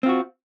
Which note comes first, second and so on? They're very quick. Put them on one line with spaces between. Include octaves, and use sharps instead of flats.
C4 F4 F#4